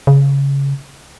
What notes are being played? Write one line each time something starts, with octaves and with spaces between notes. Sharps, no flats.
C#3